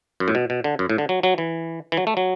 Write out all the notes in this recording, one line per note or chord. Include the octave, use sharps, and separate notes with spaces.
F#2
A2
B2
B2
D3
F#2
A2
D3
F#3
F#3
E3
E3
F#3
A3
F#3